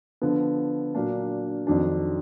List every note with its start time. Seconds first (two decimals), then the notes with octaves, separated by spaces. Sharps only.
0.22 D3 F3 B3
0.95 A#2 F#3 A#3 D4
1.67 F2 D#3 F#3 D4